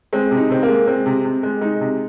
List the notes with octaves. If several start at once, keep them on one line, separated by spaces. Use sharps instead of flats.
G#3 C4
C3
D#4
C3 C4
A#3
G#3
G#3 C4
C3
C3
G#3
G#3 D#4
C3